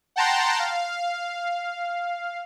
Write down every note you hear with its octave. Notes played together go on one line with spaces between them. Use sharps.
F#5 G5 A5 A#5 C6
F5